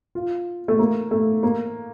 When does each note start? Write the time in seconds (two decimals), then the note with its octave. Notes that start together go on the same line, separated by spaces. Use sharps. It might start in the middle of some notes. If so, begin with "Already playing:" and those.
0.15 F4
0.68 A3
0.79 A#3
1.11 A3
1.43 A#3